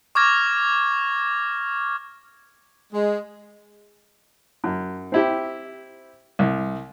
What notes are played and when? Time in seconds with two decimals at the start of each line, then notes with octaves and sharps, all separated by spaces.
0.15 C#6 D6 F6 G#6 A#6
2.93 G#3
4.64 F#2
5.12 C4 E4 G4
6.39 C2